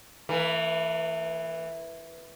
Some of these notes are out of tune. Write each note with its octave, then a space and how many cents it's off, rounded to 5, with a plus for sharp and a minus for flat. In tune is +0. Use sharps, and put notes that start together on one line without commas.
E3 +0 A#3 -45